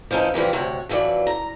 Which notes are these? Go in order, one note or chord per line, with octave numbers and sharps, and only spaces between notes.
F3 B3 C#4 D#4 E4
C3 E3 F3 G3
D2 C3 C#5 F#5
F2 E3 F#3 B4 D5
A#5